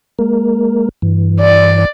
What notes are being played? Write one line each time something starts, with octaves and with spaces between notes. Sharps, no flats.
G#3 A#3 A#4
G2 E3
D5